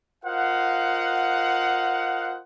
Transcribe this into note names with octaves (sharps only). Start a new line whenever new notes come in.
F4 A#4 C5 D#5 F5 F#5